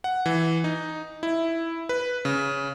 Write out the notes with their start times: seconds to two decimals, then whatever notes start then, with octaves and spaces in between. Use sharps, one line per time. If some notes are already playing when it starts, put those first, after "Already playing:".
0.04 F#5
0.26 E3
0.64 D#4
1.23 E4
1.89 B4
2.25 C#3